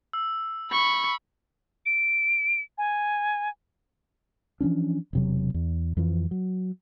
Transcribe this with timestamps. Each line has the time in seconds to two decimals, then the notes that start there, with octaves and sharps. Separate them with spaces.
0.13 E6
0.72 B5 C#6
1.86 D7
2.78 G#5
4.60 E3 F3 C#4 D4
5.13 E1 C3 F#3
5.54 E2
5.97 F2 E3 F3
6.31 F#3